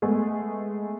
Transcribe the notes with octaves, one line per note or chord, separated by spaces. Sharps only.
G#3 A3 B3 G#4